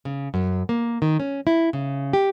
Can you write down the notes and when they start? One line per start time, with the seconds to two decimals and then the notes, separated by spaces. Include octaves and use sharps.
0.05 C#3
0.34 F#2
0.69 A#3
1.02 D#3
1.20 C#4
1.47 E4
1.73 C#3
2.13 G4